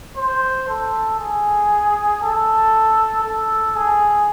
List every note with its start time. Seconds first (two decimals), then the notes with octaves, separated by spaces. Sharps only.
0.17 C5
0.68 A4
1.19 G#4
2.22 A4
3.24 A4
3.76 G#4